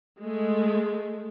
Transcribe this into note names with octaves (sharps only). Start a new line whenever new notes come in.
G#3 A3